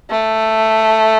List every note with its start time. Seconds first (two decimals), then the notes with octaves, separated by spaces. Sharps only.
0.10 A3